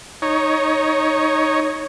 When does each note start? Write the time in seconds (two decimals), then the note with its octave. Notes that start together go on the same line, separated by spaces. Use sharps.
0.22 D#4 C#5